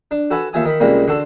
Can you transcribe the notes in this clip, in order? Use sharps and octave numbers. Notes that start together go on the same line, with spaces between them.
D4
F#4 A4 B4 F#5 G#5
D#2 F4 E5 G#5 D#6
D#3 B5
C#2 G#2 C3 G3 A#3
D3 F#4 A4 C6